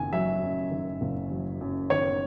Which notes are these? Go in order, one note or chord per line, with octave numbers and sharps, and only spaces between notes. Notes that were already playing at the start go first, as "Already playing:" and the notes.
Already playing: F#1 F#2 D#3 G#5
F#3 E5
F#2
D#3
F#1
F#3
F#2
D#3 C#5